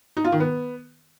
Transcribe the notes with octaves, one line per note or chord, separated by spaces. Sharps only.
D#4
F4
D#3
B3